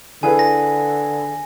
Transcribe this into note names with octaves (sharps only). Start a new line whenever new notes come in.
D3 E4 G#4 B4 G#5
A#6